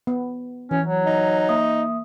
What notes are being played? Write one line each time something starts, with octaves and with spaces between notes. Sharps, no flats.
B3
E3 C#4
F#3
D#4
A#3 E5 D#6